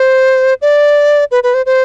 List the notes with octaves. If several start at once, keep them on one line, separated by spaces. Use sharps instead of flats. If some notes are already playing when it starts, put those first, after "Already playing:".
Already playing: C5
D5
B4
B4
C5
C5